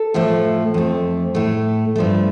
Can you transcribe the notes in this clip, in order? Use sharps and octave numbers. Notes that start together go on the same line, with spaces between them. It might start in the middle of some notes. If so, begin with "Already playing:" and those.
Already playing: A4
A2 F3 A3
F2 F3 A3
A2 A3
G2 F3 A3